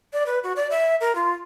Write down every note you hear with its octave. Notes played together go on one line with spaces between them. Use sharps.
D5
B4
F#4
D5
E5
A#4
F4